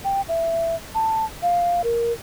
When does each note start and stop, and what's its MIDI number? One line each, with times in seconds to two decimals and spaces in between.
0.04 0.21 79
0.29 0.75 76
0.95 1.25 81
1.42 1.82 77
1.84 2.12 70